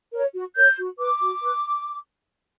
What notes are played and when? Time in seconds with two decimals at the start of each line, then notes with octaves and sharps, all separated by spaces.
0.12 A#4 C#5
0.34 F#4
0.55 A#4 C#5 G6
0.77 F#4
0.98 B4 D6
1.20 F#4
1.42 B4